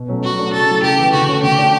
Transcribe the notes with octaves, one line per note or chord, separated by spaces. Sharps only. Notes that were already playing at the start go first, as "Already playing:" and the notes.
Already playing: B2
F#3 A3 C#4
F#3 F#4
A3 D4
C#3 A4
F#3 A3 E4
C#3 G4
E3 A3
D3 F#4
A3 C#4
D3 G4
A3 D4